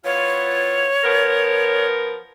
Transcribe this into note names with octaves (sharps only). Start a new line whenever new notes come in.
E3 B3 F4 C#5
F3 B3 A#4